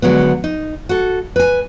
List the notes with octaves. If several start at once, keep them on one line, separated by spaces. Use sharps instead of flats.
D3 F#3 G#3 B3
D#4
F#4 A4
B4 G#5